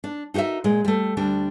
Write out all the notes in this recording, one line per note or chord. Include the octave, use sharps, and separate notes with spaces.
D4
D#4 F#4 G4 A#4 E5
A#2 G#3
G3 A3
D2 G3 D4